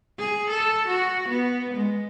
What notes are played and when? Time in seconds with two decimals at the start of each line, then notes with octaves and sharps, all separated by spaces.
0.18 G#4
0.49 A4
0.88 F#4
1.28 B3
1.74 G#3